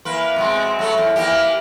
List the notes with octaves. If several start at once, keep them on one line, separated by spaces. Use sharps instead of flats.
E3 A#3 B4
B2 G#3 C4
F#3 A3 B3
E2
E3 A#3 G4